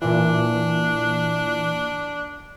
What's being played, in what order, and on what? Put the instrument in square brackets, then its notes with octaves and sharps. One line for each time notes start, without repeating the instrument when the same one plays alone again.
[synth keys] A#2 E3 [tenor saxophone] D4